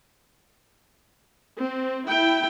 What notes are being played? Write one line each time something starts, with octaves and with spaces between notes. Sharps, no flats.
C4
E4 G5